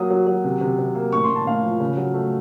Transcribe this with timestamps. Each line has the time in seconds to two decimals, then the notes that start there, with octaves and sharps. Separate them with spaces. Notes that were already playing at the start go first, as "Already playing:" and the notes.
Already playing: F#3 A#3 D#6
0.10 F#3
0.27 F#3
0.44 C3
0.61 C3
0.79 C3
0.95 A#3
1.12 A2 C#6
1.24 C6
1.29 A2
1.36 A5
1.47 A2 F5
1.63 F3
1.80 C#3
1.97 F#3
2.14 A3